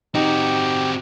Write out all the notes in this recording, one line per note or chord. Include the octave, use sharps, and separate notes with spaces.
C4 D#4 F#4 G4